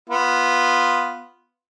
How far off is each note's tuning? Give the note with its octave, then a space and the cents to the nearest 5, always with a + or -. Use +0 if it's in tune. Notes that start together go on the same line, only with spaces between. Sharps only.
B3 +0 F4 +0